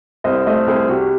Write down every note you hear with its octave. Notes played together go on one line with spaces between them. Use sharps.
C2 C5 D#5
A3 C5 D#5
C2 G#4 C5
C3 F#4